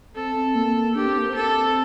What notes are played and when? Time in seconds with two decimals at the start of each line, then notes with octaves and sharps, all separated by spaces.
0.16 C4 A4
0.36 C4
0.55 A#3
0.74 A#3
0.95 D4 G4
1.06 C4
1.18 A#3
1.30 C4 A4